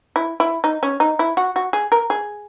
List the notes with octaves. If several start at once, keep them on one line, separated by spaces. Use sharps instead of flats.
E4
E4
D#4
C#4
D#4
E4
F#4
F#4
G#4
A#4
G#4